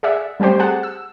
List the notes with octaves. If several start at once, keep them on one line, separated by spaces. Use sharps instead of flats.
G#4 D5 E5 F#5
G3 A3 C4 G4 C5
G#4 F#5 A5
E6